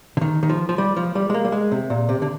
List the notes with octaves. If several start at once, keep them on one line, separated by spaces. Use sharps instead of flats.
D3
D#3
D#3
F3
F3
G3
F3
G3
G#3
A#3
G3
G#3
C3
A#2
C3
D3